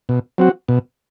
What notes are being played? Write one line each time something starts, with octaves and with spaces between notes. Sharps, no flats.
B2
F#3 C4 F#4
B2